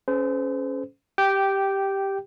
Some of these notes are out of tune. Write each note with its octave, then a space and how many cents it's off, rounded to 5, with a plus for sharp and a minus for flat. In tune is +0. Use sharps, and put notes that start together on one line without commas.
C#4 +0 A4 -45 C5 -35
G4 +0 G5 -10